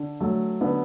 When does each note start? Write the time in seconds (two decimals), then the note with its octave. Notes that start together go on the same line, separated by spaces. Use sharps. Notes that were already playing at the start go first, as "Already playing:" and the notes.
Already playing: D3
0.21 F#3 A3
0.61 D3 B3